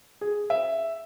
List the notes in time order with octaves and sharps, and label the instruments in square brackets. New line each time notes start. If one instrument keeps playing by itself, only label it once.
[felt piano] G#4
E5